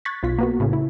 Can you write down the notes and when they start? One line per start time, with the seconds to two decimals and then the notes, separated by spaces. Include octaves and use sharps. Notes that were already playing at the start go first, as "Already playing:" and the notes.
0.05 C#6 F#6 G#6 A6 B6
0.23 B1 F4 B6
0.38 A#3 B3 F#4
0.60 A2 C#3
0.73 E4